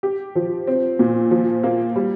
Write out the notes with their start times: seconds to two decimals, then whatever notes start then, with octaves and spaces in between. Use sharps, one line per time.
0.03 G4
0.35 F3
0.67 C4
0.99 A#2
1.31 F3
1.63 A#3
1.96 G3